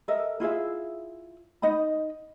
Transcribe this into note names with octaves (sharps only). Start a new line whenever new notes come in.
A4 A#4 D#5 E5
E4 F4 G#4 E5
D#4 D#5 F#5 B5